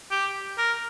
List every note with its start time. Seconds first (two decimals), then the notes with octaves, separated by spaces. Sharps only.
0.11 G4
0.58 A#4